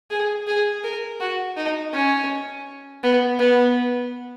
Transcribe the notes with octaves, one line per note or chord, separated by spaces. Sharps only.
G#4
G#4
A#4
F#4
D#4
C#4
B3
B3